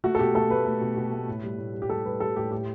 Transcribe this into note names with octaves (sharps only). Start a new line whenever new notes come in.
A3 F#4
A4
B2 G4
A3 A4
A3 B4
A3
B2
B2
A3
A2
G3
A2
G3
G4
G3 A4
G3 B4
G3 A4
A2 G4
A2 G4